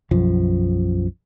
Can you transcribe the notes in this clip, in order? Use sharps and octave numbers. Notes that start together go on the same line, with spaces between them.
B1 F#2 F3